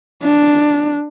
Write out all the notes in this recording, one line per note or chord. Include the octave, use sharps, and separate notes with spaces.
D4